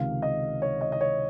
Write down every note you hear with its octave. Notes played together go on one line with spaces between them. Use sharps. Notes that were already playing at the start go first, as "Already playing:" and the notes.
Already playing: C#2 C3 D#3 F5
D#5
C#5
D#5
D#5
C#5